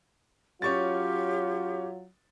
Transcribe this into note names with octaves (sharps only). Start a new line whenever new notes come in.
F#3 C#4 F4 G4 C#6 A6